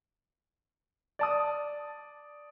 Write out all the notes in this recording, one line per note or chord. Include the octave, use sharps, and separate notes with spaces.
D5 A5 D#6